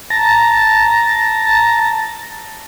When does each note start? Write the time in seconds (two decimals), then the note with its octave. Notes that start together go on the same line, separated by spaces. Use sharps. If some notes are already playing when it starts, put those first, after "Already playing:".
0.10 A5 A#5